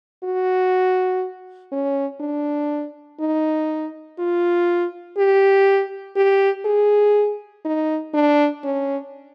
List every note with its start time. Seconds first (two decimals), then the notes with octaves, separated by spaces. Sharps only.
0.24 F#4
1.72 C#4
2.20 D4
3.20 D#4
4.19 F4
5.17 G4
6.16 G4
6.65 G#4
7.65 D#4
8.14 D4
8.63 C#4